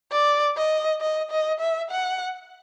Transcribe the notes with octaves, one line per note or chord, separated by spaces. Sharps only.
D5
D#5
D#5
D#5
E5
F#5